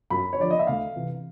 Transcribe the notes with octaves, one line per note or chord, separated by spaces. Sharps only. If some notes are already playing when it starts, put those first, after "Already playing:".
F#2 B5
C#5
D3 F3 D5
D#5
E5
D2 F5
C3 E3